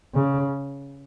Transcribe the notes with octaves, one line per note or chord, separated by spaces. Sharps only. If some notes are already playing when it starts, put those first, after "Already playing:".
C#3